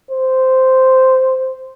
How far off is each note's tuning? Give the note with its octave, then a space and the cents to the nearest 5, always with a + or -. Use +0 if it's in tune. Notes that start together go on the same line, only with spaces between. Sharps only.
C5 -5